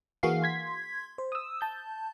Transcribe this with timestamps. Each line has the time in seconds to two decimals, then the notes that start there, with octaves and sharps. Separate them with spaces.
0.23 E3 A#3 F#4 G#4 F5 C7
0.43 C6 G#6 B6
1.18 C5
1.32 D#6 E6
1.61 A5 G6